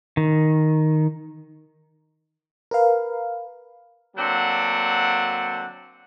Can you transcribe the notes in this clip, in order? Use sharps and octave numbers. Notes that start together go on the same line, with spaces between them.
D#3
A#4 B4 F5
D3 F#3 A#3 C4 D4 F#5